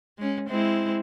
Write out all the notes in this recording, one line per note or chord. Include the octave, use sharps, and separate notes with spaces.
G#3 C#4
G#3 C4 E4